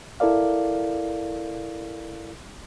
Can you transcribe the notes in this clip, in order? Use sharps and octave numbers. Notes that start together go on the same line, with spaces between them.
E4 A4 A#4 D5 F5